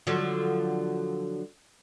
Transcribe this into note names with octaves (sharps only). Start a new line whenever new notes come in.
D3 F3 F#3